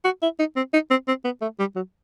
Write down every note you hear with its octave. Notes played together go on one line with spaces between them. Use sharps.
F#4
E4
D#4
C4
D#4
C4
C4
B3
A3
G3
F#3